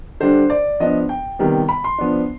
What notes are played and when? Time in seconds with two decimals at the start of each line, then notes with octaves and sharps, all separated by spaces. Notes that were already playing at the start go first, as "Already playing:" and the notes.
0.20 D3 G3 D4 C5
0.50 D5
0.80 F3 B3 D4 D#5
1.09 G5
1.39 C3 D#3 G3 B3
1.69 B5
1.84 C6
1.98 F3 B3 D4